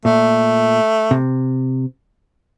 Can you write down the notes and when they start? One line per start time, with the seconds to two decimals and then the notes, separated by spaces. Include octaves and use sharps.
0.05 A#2 A3
1.11 C3